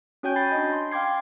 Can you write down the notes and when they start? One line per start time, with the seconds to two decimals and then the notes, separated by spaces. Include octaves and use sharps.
0.23 C#4 F#4 C#5 G5 G#5 G6
0.36 B5 G6 A6 C7
0.52 D4 D#5
0.73 C6
0.92 F5 G5 C6 D6 G#6 C7